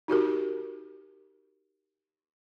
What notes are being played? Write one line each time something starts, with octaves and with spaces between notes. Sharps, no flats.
D#4 F#4 G4 A#4